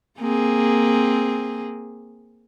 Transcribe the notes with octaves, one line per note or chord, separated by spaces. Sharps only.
A#3 C4 G#4